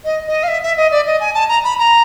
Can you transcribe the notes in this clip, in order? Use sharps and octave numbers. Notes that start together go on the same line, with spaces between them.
D#5
D#5
F5
E5
E5
D#5
D5
D#5
G#5
A5
A#5
B5
A#5